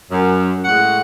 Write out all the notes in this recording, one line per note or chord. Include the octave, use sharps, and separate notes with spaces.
F#2
A2 G#3 C#5 F#5